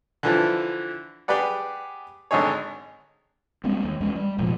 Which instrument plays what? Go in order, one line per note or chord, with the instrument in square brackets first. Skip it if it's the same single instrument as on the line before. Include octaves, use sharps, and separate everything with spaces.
[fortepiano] D3 E3 F3
G4 G#4 B4 D5 F#5
G#1 D3 D#4 G#4 C#5
[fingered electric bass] G3 G#3 A#3 C4
D#2
E2 G#3 C#4
G3
F1 A#2 F3 G#3